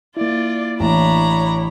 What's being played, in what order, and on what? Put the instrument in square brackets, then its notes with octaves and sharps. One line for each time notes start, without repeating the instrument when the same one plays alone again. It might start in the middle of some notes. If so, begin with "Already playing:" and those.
[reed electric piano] A#3 E4 [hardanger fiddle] F4 [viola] D5
[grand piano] A1 [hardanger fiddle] D4 A#5 [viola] C#5 B5